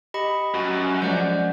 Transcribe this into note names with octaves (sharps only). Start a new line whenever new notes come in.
G4 D#5 B5 C#7
F#2 F#4
F3 G#3 C#4 D5 F#5 G6